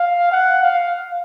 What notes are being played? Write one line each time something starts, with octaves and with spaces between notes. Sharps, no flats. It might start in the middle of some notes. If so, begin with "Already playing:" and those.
Already playing: F5
F#5
F5